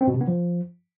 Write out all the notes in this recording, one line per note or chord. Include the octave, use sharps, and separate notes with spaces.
C4
B2
C3
B3
F3